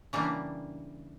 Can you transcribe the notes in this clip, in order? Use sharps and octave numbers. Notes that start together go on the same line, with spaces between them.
C#3 E3 G3 A#3 D4